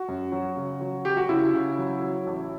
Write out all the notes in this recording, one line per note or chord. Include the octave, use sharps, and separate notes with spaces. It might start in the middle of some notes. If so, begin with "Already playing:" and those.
Already playing: F#4
F#2
F#3
C#3
F#3
F#3 G4
F#4
C#3 E4
C#3
F#3
F#3
A1